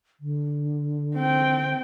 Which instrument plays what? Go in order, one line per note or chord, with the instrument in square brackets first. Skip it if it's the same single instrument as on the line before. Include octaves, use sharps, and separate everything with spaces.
[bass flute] D3
[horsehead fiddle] C4 G5